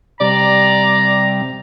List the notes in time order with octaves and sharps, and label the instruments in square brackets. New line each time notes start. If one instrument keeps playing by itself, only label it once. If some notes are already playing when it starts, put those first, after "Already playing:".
[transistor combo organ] C3 G3 [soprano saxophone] D5 [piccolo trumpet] A#5